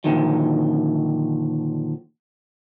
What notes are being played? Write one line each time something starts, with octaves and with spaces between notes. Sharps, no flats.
A#2 D3 D#3 F3 F#3